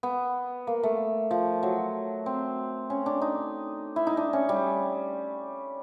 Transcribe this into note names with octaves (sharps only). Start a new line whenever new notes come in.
B3
A#3
A3
F3
F#3
C4
C#4
D4
D#4
E4
D#4
D4
C#4
G3